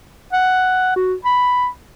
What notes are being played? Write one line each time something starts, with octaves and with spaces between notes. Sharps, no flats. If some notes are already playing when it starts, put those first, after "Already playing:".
F#5
F#4
B5